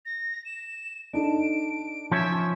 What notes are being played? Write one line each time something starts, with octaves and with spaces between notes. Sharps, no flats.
A#6
E7
D4 D#4 A4 D7
F3 C#4 C#5 E5